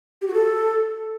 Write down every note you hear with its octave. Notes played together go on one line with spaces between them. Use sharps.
G4
F#4
A4